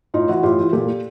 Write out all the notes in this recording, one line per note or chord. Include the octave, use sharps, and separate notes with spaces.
A2 D#4 F4
E3 E4 F#4
A2 F4 G4
E3
A#2 G4 A4